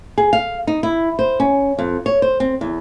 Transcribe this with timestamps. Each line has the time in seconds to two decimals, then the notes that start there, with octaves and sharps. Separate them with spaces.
0.18 G#4
0.33 F5
0.67 D#4
0.83 E4
1.19 C5
1.40 C#4
1.78 F2
2.06 C#5
2.22 C5
2.40 C4
2.61 E2